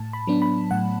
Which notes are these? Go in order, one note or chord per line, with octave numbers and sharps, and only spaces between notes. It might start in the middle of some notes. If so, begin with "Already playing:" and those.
Already playing: A2 A5
B5
F#3 B3 D4
B5
A2 F#5